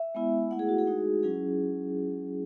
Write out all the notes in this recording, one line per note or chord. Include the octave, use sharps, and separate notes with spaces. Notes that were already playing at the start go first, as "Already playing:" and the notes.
Already playing: E5
G#3 B3 E4
A3 E4 F#5
G#4
F#4
G#4
G#3 D#4 F#4
F#3 C#4 E4 G#4